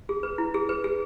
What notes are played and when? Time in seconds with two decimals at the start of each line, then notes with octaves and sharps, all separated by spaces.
0.09 G#4
0.23 B4
0.38 E4
0.54 G#4
0.69 B4
0.84 G#4